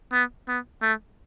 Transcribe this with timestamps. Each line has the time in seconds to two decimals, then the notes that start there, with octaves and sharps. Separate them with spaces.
0.13 B3
0.48 B3
0.82 A3